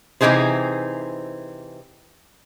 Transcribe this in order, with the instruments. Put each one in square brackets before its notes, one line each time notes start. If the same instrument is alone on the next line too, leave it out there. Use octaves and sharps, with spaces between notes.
[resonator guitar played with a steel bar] C3 E3 G3 D#4 G#4 C5